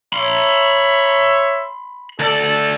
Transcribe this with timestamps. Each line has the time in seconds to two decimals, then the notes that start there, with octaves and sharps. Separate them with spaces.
0.13 C#5 E5 B5 C6
2.19 D2 A4 D5